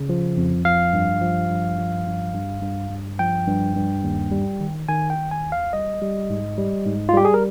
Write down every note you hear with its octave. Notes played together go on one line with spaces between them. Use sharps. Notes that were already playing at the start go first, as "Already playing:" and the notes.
Already playing: C#3
F3
F2
F3 F5
G2
F3
G2
F3
G2
G2
G2
G2
F3 G5
G2
G2
D#2
G3
D#3
D#3 G#5
G5
D#3
G#5
D#2
F5
G3 D#5
G3
G#2
G3
G#2
F4
G3 G4
G#4
A#4